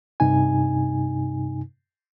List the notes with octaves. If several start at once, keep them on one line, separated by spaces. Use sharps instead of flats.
G2 C3 D#4 G#5